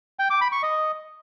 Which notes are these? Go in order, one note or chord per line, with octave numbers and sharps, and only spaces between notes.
G5
D6
B5
C#6
D#5